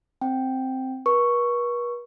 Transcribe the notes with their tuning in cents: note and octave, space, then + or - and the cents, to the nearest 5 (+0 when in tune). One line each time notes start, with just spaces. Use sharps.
C4 +0 G5 +0
B4 -45 C#6 +0